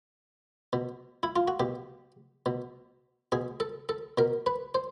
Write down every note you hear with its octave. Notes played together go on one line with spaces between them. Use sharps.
B2
E4
F4
F#4
B2 G4
B2
B2 G#4
A4
A4
B2 A#4
B4
C5